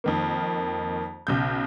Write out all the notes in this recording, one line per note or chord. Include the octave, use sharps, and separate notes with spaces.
F2 D#3 A#3
B1 C#3 G6